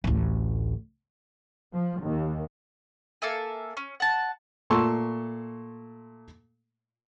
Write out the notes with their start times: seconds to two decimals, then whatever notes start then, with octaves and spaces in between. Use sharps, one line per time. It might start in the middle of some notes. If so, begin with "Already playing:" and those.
0.04 A1 D2
1.73 F3
2.02 D#2
3.22 A#3 A4 E5 G#5
3.77 C#4
4.00 F#5 A5
4.70 A#2 A3 A5 C6 C#6 E6